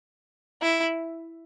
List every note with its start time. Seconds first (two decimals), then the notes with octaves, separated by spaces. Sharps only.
0.62 E4